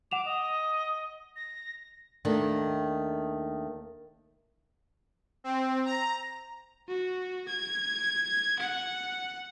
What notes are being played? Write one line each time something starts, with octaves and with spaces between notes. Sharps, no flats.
F#5 D6 E7 F7
D#5
A#6
D#2 D#3 A3 D4
C4
A#5
F#4
G#6
F#5